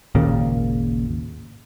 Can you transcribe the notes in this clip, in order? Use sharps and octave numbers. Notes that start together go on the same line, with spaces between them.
G#1 D#2 A#2 C#3